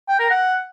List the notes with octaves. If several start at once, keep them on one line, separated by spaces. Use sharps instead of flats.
G5
A#4
F#5